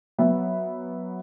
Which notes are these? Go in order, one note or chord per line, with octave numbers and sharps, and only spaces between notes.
F#3 B3 E5